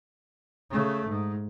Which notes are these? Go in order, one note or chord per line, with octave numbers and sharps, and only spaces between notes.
C#3 A3
G#2